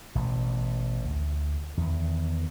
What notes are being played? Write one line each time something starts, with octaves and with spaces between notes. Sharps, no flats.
A1 B2
D2
E2 D#3